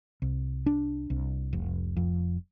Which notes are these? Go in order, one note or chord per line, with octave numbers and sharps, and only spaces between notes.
C2
D4
C2
F1
F2